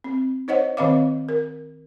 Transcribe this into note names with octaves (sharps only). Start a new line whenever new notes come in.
C4
D#4 C5 C#5 D#5 F#5
D#3 C4 B4 D#5 F5 D6
A#4